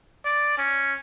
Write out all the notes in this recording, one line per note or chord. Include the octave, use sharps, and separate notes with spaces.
D5
C#4